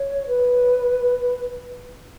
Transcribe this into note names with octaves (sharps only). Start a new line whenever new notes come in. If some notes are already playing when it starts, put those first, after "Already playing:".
Already playing: C#5
B4